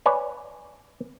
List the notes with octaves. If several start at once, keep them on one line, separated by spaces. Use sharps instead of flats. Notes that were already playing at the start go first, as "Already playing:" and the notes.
B4 C#5 D5 G#5